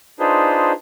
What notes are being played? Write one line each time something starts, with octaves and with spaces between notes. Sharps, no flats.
D4 D#4 F4 G#4 B4 C5